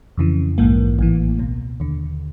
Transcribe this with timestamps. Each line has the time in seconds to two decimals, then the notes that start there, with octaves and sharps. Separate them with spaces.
0.18 F2 C#3 E3
0.58 A#1 G#2 E3 A#3
0.99 A1 A2 E3
1.39 C#2 B2
1.80 D#2 D3